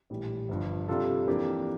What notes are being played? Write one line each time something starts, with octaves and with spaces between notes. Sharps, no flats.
A#1 A2 E3 G3
G1 G2 F3
C3 G3 D4 F4 A4
F2 E3 A#3 D4 G4